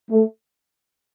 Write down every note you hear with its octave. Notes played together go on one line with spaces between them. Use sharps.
A3